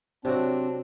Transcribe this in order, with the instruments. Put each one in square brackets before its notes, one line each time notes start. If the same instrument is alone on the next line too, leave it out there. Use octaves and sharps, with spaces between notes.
[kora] C3 F#3 F#4 [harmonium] C4 D4